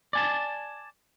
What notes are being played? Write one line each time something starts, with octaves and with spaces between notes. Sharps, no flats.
D5 G#5 A5